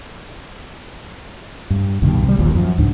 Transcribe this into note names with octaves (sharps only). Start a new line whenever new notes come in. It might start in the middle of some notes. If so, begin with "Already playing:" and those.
G2
C2 G2 B2 D#3
C3 G3
D#1 A#1 D#2 A#2
F#2 F3
C#2 G#2 D4